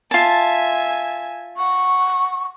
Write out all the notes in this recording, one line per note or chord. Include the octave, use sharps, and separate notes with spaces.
F4 E5 G#5 A5
F#5 C#6